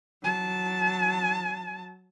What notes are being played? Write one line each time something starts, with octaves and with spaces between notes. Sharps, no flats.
F#3 A5